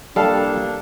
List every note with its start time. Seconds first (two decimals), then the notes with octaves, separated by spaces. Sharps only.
0.16 C2 G3 A#3 D4 A4 F5 A5